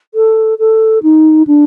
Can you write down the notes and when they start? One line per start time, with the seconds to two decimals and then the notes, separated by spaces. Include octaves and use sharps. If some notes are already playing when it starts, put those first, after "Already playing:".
0.14 A4
0.59 A4
1.03 D#4
1.47 D4